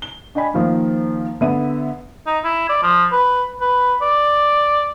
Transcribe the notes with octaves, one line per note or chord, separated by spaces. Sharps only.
G7
D4 D#5 G5 G#5 B5
D#3 F3 A#3
D3 B3 E5 D#7
D#4
E4
D5
F3
B4
B4
D5